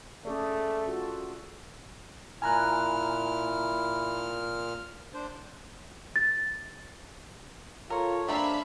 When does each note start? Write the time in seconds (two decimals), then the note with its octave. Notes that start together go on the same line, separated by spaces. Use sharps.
0.25 A3 C#4 G#4 D5
0.87 F4 F#4 A4
2.42 A#2 E4 G#5 A#5 F6 F#6
5.14 D4 C5
6.16 A6
7.90 F4 A4 A#4 C#5
8.29 G3 A#3 C4 D4 E5 F5 B5